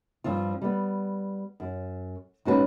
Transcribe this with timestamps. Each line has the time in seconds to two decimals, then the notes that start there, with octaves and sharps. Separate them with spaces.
0.24 G2 F3 C4 F4
0.62 G3 B3
1.60 F#2
2.45 G#2 C#4 F#4 A4 B4